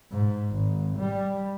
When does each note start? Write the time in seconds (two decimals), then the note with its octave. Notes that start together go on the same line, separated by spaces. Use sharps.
0.12 G#2
0.51 G#1
0.98 G3